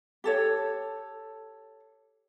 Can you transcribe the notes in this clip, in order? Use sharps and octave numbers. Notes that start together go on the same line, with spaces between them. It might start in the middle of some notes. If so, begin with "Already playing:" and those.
G4 A4 C#5